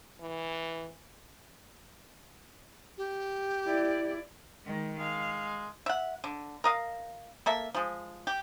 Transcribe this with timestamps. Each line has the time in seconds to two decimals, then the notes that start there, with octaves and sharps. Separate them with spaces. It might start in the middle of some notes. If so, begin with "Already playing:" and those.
0.21 E3
2.98 G4
3.66 E4 D5
4.64 D#3 G#3
4.99 G#3 F5
5.86 E5 F#5
6.24 D3
6.64 A#4 D#5 F5
7.46 A#3 A4 E5
7.75 F3 G#3
8.27 G4